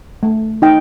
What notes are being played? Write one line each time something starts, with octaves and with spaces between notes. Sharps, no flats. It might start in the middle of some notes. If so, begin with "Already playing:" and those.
A3
D#4 G5